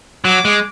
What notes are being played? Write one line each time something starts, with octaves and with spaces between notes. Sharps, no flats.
F#3 D6
G#3